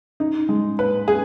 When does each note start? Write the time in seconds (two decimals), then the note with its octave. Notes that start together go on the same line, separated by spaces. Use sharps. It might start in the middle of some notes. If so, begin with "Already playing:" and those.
0.20 D#4
0.49 G#3
0.79 B4
1.08 G#4